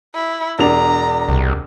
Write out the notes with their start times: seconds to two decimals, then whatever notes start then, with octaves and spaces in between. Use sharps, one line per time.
0.15 E4
0.59 E1 D4 A#5 F7
1.29 C2